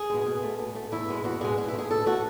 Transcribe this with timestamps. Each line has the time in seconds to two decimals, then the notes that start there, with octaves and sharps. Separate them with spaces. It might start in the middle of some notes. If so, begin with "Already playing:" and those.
Already playing: G#4
0.10 B2 G#3
0.26 B2
0.43 A3
0.59 B2
0.75 A3
0.92 E2 E4
1.08 B2 G#3
1.24 E2 F#4
1.41 B2 G#3 G#4
1.57 B2 G#4
1.68 E4
1.74 A3
1.79 G#4
1.90 B2 A4
2.06 A3 F#4